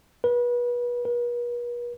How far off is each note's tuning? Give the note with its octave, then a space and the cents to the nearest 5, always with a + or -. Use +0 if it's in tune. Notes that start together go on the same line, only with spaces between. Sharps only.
B4 -30
B4 -45